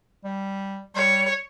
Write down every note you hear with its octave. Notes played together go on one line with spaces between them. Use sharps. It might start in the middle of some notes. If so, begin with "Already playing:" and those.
G3
G3 C#5